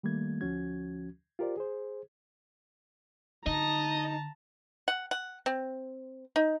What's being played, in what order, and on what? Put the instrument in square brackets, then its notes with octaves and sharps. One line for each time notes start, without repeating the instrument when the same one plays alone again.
[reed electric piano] D#3 G3 A3 A#3 G#6
D2 F3 C#4 F#4 G#6
F4 G4 A#4 C5 D5
G#4 C5
[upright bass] D3 [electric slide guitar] D#4 [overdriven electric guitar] D#5 [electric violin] A5 A#5
[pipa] F#5
F#5
C4
D#4